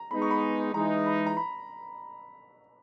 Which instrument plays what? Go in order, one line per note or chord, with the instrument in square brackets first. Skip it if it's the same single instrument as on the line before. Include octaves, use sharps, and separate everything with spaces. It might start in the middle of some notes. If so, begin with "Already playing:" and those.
Already playing: [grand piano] A#5
[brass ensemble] G#3 B3 D#4 [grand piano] B5
[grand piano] C#6
B5
[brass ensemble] E3 G#3 D#4 [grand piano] A#5
[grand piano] B5
A#5
B5